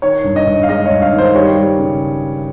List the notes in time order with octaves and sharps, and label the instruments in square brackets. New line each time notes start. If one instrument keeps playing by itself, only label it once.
[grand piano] D#3 C#5
G2
D#5
G2
F5
G#3 D#5
G2 C#5
F5
D#3
C5
G3 C#5
G3
C#3